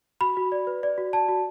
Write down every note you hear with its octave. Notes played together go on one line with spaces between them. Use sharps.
F#4 B5
F#4
D5
B4
D5
F#4
D5 A5
F#4